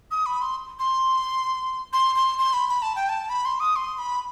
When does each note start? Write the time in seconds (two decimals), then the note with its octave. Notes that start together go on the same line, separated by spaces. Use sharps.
0.11 D#6
0.26 B5
0.42 C6
0.79 C6
1.93 C6
2.16 C6
2.39 C6
2.53 B5
2.69 B5
2.82 A5
2.96 G5
3.09 A5
3.30 B5
3.45 C6
3.60 D#6
3.76 C6
3.98 B5